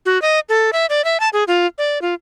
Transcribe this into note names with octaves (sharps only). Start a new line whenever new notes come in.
F#4
D#5
A4
E5
D5
E5
A5
G#4
F4
D5
F4